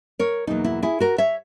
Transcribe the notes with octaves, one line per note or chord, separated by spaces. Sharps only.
A#4 C#5
E2 B2 F#3 A#3 D#4
E4
E4 G#4
F#4 A#4
C#5 E5